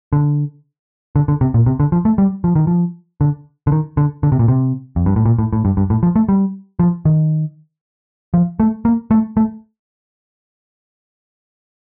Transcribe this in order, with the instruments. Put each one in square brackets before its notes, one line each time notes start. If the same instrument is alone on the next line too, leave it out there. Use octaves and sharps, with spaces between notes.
[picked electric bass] D3
D3
D3
C3
A#2
C3
D3
F3
A3
G3
F3
D#3
F3
D3
D3
D#3
D3
D3
C3
A#2
C3
F2
G2
A2
A#2
A2
A2
G2
G2
A2
F3
A3
G3
F3
D#3
F3
A3
A#3
A3
A3